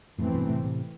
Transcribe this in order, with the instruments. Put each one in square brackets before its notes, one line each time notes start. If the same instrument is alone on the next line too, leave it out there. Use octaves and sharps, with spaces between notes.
[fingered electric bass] F2 A2 [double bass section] E3 A3 C4
[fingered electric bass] G2 B2
A2 C3
A2 C3